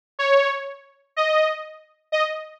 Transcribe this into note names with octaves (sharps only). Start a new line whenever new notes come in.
C#5
D#5
D#5